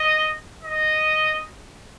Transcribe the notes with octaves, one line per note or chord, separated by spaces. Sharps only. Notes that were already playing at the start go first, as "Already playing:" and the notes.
Already playing: D#5
D#5